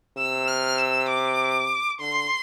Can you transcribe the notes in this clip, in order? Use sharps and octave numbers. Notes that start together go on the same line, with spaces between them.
C3 E6
F6
E6
D6
D3 C6